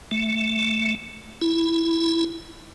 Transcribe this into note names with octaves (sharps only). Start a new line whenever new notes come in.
A3
E4